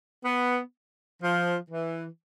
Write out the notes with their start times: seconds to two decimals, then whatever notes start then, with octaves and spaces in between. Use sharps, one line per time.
0.24 B3
1.22 F3
1.70 E3